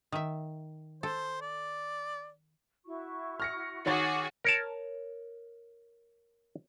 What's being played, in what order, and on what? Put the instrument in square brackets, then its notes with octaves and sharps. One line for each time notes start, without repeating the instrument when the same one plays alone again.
[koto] D#3 E5
[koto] A4 [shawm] C5
[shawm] D5
[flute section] E4 F#4 C#6
[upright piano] F6 A#6 C#7
[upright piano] D#3 C#5 A6 [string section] F#4 G#4 [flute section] F#5 D6
[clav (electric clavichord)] A#4 C#5 A5